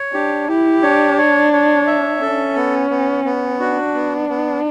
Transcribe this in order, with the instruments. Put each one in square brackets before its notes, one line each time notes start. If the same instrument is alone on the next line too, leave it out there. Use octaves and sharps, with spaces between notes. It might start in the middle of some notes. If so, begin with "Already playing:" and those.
Already playing: [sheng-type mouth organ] C#5
[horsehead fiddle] D4 [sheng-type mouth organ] G4
[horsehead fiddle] E4 [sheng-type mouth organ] G4
[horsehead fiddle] D4 [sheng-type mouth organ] C#5
[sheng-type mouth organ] C#5
C#5
E5
[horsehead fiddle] C#4 [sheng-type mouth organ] A4
[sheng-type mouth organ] B3
B3
B3
[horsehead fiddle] D4 [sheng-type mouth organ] F#4
[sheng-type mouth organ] B3
B3